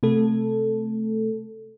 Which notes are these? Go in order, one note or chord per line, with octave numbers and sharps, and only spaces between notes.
C3 A3 A4